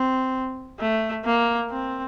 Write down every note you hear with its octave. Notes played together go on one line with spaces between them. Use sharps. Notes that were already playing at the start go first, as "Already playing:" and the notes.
Already playing: C4
A3
A#3
C4